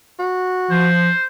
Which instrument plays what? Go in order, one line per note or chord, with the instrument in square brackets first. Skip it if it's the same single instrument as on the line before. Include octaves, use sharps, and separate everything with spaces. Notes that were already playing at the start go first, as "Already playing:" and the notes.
[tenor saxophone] F#4
[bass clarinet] F3 [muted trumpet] C5